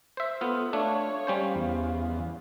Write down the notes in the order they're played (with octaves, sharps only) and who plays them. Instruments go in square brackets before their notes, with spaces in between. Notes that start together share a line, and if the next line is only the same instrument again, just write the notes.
[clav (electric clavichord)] C5 E5
[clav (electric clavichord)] B3 F4 [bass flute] A4
[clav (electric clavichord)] A3 D4 [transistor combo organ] C#5 [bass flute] F5
[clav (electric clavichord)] G3 C#4 C5
[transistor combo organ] E2